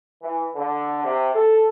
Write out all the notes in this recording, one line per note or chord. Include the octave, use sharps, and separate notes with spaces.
E3
D3
C3
A4